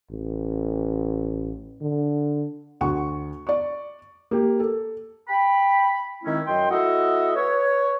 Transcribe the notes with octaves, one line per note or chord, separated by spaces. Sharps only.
A1
D3
D2 F#5 C#6
D5 C#6
A#3 G4
A4
G5 B5
D#3 G#3 C4 C#4 E4
F#2 F#3 D#5 G5 C6
A3 E4 F#4 D#5 E5 F#5
B4 C#5